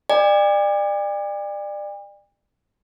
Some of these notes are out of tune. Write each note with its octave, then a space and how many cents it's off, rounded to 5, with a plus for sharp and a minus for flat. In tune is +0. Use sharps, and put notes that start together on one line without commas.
D5 +30 G5 +45